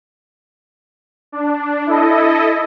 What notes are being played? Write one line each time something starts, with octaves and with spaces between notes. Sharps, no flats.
D4
E4 A4 D#5